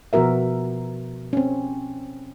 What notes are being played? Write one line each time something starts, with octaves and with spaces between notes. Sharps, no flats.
B2 F3 B3 F#4 A#4 E5
C4 C#4